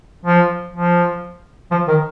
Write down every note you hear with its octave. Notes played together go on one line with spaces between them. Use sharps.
F3
F3
F3
D#3